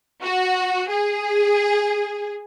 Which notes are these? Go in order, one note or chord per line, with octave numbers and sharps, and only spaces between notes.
F#4
G#4